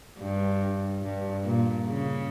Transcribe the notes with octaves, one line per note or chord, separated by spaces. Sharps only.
G2
G2
A#2
C#3